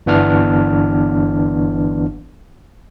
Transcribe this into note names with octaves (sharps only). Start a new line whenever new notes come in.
G1 E3 B3 D4 F6